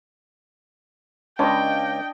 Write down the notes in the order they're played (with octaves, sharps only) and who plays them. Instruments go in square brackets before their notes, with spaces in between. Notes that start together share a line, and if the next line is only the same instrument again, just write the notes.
[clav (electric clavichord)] C#2 [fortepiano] C#4 [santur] D4 D#5 [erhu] G5